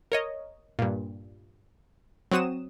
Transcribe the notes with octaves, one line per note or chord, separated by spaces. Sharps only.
A#4 C#5 D#5
G2 A#2
F#3 C4 F#4 D#6 E7